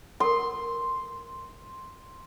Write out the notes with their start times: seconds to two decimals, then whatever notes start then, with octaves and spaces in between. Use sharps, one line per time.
0.20 A4 A#4 C6